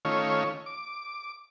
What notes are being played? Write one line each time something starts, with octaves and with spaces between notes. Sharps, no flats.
D#3 A3 C#4 F4 C#5
D6